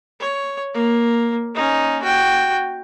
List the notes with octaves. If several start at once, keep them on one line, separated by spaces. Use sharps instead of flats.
C#5
A#3
C#4 D#4
F#4 G5